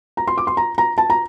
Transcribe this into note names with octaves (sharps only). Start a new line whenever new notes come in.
A#5
C6
D6
C6
A#5
A#5
A5
A#5